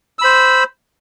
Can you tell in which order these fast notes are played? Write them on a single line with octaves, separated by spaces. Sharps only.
E6 B5 C5